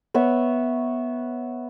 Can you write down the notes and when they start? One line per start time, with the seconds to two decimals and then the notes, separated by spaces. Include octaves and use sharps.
0.14 B3 C#5 E5